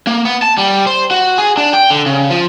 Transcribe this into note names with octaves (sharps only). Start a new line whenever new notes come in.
A#3
B3
A5
G3
C5
F#4
G#4
D4
G5
D3
C#3
F3